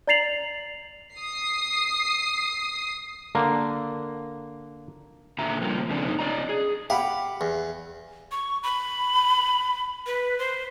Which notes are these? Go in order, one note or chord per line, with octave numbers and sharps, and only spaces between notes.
D5 A#5 A6 C7 F7 F#7
D#6 C7
D3 A#3
A#2 D3 E5 A#5
C#3 F3 G3 A#3
A#2 C#3 A3 C4 D4
F#2 C3 D#4
C#4 D5 D#5 A#5
G#4
G4 F5 F#5 B5
E2
C#6
B5
B4
C5